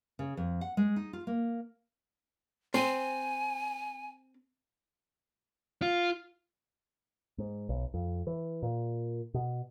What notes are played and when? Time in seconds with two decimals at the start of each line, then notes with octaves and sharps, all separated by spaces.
0.19 C#3
0.37 F2
0.61 F#5
0.77 G#3
0.96 D#4
1.13 F4
1.27 A#3
2.74 C4 G#5
5.82 F4
7.38 G#2
7.69 B1
7.94 F2
8.27 E3
8.63 A#2
9.34 B2